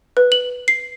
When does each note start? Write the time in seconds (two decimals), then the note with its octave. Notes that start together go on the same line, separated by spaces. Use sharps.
0.17 B4
0.32 F#7
0.68 C7